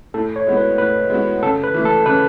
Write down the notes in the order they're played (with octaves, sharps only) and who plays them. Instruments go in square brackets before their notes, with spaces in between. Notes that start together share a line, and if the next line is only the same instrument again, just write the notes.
[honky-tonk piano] A2 [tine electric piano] A4
[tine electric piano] C#5
[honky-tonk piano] G#3 B3 F#4
[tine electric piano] B4
[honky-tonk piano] A2 [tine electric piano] B4
[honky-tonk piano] G#3 B3 F#4
[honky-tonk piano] C#3 [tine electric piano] A4
[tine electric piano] B4
[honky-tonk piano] E3 A3
[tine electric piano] A4
[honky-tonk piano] C#3 [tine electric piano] B4